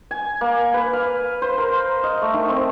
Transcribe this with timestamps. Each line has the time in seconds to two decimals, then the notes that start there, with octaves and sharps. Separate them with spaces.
0.11 G#5
0.41 A#3
0.74 B4
0.93 F5
1.42 C5
1.58 A#4
2.04 D#5
2.22 A3
2.34 D#3
2.49 C4